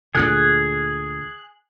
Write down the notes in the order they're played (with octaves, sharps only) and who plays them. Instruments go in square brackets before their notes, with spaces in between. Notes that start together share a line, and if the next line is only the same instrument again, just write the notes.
[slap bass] D2 A#2 D3 [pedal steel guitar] G#4 F#6